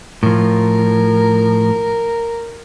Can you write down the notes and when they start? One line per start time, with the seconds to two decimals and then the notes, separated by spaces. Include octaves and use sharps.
0.23 A2 F3 A#4